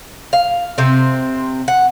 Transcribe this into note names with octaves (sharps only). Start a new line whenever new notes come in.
F5
C3 C4
F#5